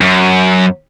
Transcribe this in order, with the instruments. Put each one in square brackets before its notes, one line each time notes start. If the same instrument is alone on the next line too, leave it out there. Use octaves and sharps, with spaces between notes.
[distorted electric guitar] F#2